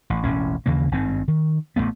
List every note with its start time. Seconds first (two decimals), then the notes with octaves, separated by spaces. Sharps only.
0.10 A1
0.24 E1 A1 A2 C#4
0.66 D#2 C#3 E3 A#3
0.92 G#1 G2 D#3 C4
1.28 D#3
1.76 A1 F#3 A3 B3